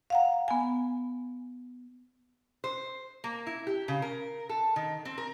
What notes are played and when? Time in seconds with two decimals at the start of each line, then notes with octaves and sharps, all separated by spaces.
0.10 F5 F#5 A#5
0.48 B3 G#5
2.64 C5
3.24 A#3
3.47 E4
3.67 G4
3.88 C#3
4.02 A#4
4.49 A4
4.76 D#3
5.05 C4
5.18 A#4